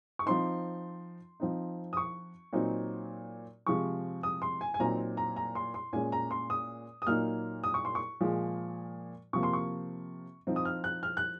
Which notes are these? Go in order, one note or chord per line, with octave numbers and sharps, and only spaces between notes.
C#6
F3 C4 D#4 C6
F3 C4 D#4
D#6
C#6
A#2 F#3 C4 D#4
C3 F3 G#3 C#6
D#6
C6
G#5
G#5
A#2 F#3 C4 D#4 A#5
A#5
A#5
C6
C6
A#2 G#3 C#4 G#5
A#5
C6
D#6
D#6
A#2 F#3 A#3 D#4 F6
D#6
C#6
C6
C#6
A#2 F3 G#3
C3 F3 A#3 C#6
C6
C#6
F3 C4 D#4
D#6
F6
F#6
F6
F#6